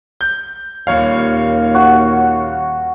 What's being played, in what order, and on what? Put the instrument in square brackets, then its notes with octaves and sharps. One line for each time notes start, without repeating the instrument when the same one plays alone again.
[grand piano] G6
[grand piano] D#1 C#5 F5 [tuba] D#2
[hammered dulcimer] F#4